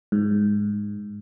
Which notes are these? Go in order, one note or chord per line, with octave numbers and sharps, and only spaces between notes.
G#2